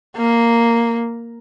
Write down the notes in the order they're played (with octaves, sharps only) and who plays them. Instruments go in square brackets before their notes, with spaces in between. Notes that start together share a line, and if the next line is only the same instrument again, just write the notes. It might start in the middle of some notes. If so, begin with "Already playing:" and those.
[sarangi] A#3